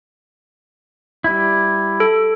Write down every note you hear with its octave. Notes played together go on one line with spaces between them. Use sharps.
G3 E4
A4